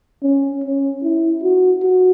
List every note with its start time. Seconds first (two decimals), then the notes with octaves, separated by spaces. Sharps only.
0.23 C#4
0.64 C#4
1.03 E4
1.43 F#4
1.83 F#4